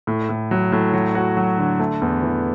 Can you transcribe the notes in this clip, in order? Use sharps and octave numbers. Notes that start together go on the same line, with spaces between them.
A2
A2
F#3
A2
F#3
F#4
F#3
D3
A3
E2
E3